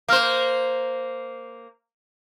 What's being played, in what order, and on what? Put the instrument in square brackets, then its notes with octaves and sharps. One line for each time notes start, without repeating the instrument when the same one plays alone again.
[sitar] A#3 C5 [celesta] F5 F6